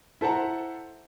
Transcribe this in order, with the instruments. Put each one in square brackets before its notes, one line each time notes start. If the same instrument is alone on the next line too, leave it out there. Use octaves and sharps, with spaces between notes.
[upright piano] E4 A4 C5 F#5 A5 A#5